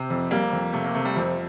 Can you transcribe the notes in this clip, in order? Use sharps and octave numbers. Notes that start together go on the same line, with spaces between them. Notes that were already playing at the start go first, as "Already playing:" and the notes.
Already playing: C3 C4
F2
G3 A#3
F2
C3 A3
A#3
C3 A3
G3
F2 F3